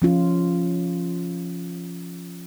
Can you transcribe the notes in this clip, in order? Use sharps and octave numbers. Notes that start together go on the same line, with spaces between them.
F3 C#4 F4